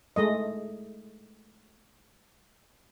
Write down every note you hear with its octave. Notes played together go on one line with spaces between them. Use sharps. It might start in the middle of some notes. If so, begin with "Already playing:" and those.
G#3 A3 D#5